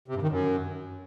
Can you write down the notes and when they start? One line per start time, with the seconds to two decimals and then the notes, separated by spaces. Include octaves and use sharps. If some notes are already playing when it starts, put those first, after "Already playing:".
0.08 C3
0.15 G2
0.22 D#3
0.29 F#2